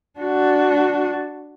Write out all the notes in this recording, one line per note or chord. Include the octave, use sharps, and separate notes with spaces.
D4 F#4